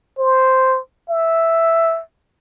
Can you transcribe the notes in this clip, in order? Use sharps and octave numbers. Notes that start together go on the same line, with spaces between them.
C5
E5